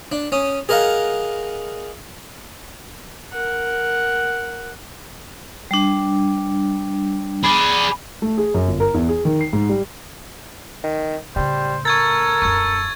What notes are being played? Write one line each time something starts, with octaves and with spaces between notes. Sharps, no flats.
D4
C#4 D#6
G#4 A#4 D#5 F5 F#5
A#4 F#5
G3 D4
G#4 D5 B5
A3
G#4
F#2
G1
A#4
E2
G#4
D#3
C7
G#2
G3
D#3
A2 C#3 G3 C5
A4 A#4 C#6 G#6 A6
D#1 F#2 C#6 G#6